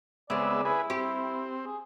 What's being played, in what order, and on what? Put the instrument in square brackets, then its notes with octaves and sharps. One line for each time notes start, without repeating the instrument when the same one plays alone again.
[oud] C#3 C4 [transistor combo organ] G#3 B3 E5 [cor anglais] D5
[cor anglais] E4 [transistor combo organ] G#4 B4
[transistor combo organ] C4 [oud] G4
[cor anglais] G#4